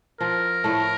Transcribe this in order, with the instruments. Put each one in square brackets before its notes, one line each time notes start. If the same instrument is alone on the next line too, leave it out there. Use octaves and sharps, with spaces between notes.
[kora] F3 [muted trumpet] A#4
[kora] A2 A3